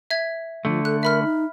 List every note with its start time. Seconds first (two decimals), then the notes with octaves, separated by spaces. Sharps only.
0.11 E5 G#6
0.65 D3 F3 A3
0.85 A4 F#6
1.03 A#4 E5 B5 F6
1.23 D#4